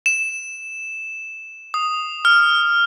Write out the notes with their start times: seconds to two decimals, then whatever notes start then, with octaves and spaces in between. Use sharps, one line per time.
0.06 E7
1.74 D#6
2.25 F6